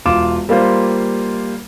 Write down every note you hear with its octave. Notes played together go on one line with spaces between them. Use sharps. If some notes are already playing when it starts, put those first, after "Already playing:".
E1 F4 D6 E7
G3 A#3 F4 C5